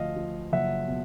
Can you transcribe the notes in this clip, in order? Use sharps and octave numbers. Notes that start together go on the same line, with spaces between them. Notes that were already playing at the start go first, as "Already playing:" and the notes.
Already playing: D2 F3 D#5 F5
F3
F#1 E5 F#5
B2